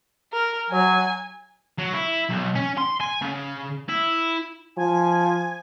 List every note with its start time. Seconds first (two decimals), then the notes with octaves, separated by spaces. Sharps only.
0.33 A#4
0.71 F#3 G#5
1.78 F#3
1.93 E4
2.29 B1
2.55 C#4
2.78 C6
3.01 G#5
3.22 C#3
3.89 E4
4.77 F3 G#5